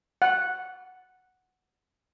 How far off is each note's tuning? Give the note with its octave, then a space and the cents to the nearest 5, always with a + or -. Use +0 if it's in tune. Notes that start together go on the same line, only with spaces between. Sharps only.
F#5 +0